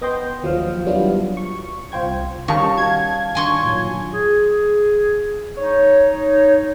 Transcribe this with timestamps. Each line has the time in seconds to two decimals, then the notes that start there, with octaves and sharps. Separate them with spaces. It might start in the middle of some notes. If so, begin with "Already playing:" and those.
0.01 B3 D#5 G5 C6 G6
0.43 D#2 F3 F#3 F5
0.86 F#3 G3 B3 D4 E4 F4
1.37 C#6
1.92 C2 F4 C5 G5 G#6
2.48 D#3 G3 C#4 G4 F5 A5 C#6
2.77 F#4 G#6
3.35 D#3 D4 D#4 G#5 C6 C#6
3.65 A#2 F#3
4.13 G#4
5.57 D#4 C#5